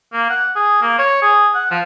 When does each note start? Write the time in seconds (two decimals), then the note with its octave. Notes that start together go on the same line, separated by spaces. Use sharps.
0.13 A#3
0.30 F#5
0.56 G#4
0.82 A#3
0.98 C#5
1.22 G#4
1.55 F#5
1.71 F3